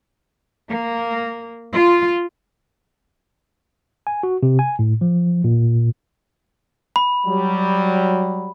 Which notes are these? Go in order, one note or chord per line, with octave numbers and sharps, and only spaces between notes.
A#3
F4
G#5
F#4
C3
G#5
A2
F3
A#2
B5
F#3 G3